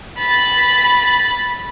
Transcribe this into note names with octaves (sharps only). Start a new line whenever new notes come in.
B5 A6